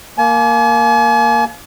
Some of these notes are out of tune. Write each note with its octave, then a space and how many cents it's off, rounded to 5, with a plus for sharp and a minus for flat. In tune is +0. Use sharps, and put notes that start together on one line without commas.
A#3 -5 G#5 +40